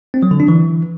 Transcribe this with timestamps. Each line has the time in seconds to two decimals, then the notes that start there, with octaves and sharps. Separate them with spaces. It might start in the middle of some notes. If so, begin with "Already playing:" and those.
0.14 C4
0.23 F#3
0.31 D3
0.40 D4
0.48 E3